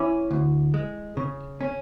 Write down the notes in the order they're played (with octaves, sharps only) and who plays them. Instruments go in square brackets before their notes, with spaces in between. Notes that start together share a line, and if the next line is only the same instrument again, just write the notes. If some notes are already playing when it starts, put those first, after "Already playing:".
Already playing: [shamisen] E3 [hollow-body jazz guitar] C#4
[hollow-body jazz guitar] D2
G#3
C#3
C#4